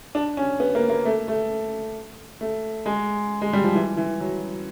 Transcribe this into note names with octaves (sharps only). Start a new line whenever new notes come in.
D4
C#4
B3
A#3
A#3
A3
A3
A3
G#3
G#3
G3
F3
E3
E3
F#3